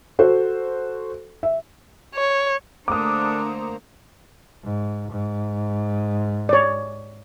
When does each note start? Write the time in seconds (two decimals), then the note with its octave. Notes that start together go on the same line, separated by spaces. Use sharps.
0.19 F#4 A4 C5
1.43 E5
2.15 C#5
2.88 D3 A3 A#3 D4 C5 A#5 D6 D#6
4.64 G#2
5.11 G#2
6.49 C#5 D5